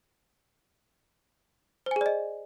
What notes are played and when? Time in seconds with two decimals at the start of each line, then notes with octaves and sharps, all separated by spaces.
1.86 C5
1.91 G#5
1.96 G#4
2.01 D5
2.06 D#5